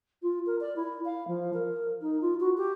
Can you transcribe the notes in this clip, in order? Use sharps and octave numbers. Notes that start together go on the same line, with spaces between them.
F4
A#4
D5
E4
F5
F3
A#4
D#4
F4
F#4
G4